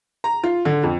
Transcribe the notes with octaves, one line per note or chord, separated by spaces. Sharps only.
A#5
F4
D3
F2